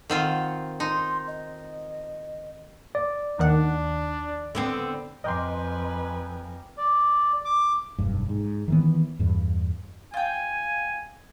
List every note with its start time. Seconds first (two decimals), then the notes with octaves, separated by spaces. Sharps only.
0.10 D#3 C4 F4 F#5
0.80 D#4 C6
1.28 D#5
2.95 D5
3.39 D#2 D#3 D4 F#5
4.55 D3 B3 C4
5.24 F2 A#4 B4 D#5 G5 G#5 C6 D6
6.78 D5
7.45 D6
7.98 F1 B1 G2
8.29 G#2
8.68 D#3 E3 B3
9.19 E2 G2
10.14 F4 G5 G#5